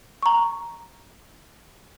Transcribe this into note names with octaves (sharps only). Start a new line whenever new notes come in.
A#5 C#6